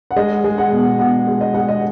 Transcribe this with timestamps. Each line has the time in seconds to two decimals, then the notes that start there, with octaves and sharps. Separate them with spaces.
0.11 F#5
0.16 G#3 D#5
0.44 G#3
0.58 F#5
0.72 B2
0.99 B2 F#5
1.27 G#3
1.41 D#5
1.54 G#3 F#5
1.68 D#5